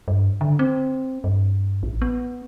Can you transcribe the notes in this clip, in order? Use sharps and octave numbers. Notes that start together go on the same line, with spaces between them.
G2
D3
C4
G2
A1
B3